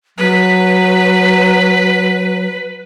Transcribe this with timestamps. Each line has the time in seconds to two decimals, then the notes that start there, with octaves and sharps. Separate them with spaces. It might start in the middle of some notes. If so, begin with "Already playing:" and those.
0.18 F#3 B4